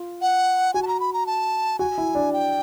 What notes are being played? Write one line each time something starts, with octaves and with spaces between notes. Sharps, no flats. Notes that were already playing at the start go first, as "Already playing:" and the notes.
Already playing: F4
F#5
F#4 G#5
A5
A#5
B5
A#5
A5
F#4 G#5
E4
D4
G5